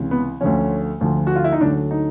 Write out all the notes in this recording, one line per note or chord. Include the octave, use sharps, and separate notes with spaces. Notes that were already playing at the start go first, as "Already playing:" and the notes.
Already playing: C#2 C3 E3
B3
D2 D3 F3 C#4
D2 D3 F3
F#4
F4
E4
D#4
D2 D3 F#3 D4
D#4